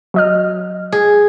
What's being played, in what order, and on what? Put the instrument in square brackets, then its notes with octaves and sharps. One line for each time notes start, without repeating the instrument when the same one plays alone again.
[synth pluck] F#3 D#5 F6
[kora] G#4